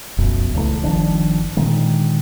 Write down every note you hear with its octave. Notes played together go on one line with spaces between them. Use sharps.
F1 B1 F#2 B2
C#2 E3 F3 A3
G1 D#3 F3 D4
A#2 D3 D#3 G#3